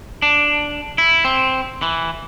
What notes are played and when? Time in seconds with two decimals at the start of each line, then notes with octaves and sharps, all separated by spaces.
0.22 D4
0.98 E4
1.25 C4
1.82 E3